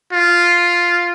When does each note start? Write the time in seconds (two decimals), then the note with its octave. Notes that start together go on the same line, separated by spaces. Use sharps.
0.13 F4